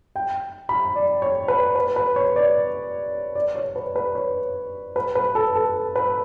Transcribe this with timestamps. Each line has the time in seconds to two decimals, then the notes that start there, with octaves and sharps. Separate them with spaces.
0.16 G5
0.69 B5
0.96 D5
1.22 C#5
1.48 B4
1.76 B4
1.96 B4
2.16 C#5
2.36 D5
3.35 D5
3.55 C#5
3.76 B4
3.96 B4
4.15 C#5
4.96 B4
5.15 B4
5.35 A4
5.55 A4
5.96 B4